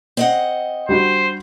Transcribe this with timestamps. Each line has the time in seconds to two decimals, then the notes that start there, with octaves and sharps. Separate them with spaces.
0.17 C4 D#5 F#5
0.89 G3 D4 F#4 C5